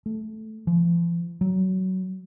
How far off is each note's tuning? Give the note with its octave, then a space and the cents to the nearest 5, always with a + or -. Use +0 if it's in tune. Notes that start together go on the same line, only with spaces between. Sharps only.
A3 -10
F3 -45
F#3 +20